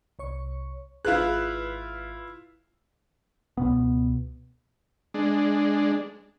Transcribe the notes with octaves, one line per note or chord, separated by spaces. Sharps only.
C2 C#5 C#6
G#1 E4 F4 G#4 B4 F5 F#6
C#2 B2 B3
G#3 D4